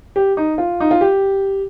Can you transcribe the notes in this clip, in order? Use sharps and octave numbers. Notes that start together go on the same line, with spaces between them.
G4
D#4
F4
D#4
F4
G4